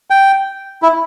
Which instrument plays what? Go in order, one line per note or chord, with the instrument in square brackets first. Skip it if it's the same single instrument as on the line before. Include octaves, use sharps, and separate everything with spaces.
[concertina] G5
E4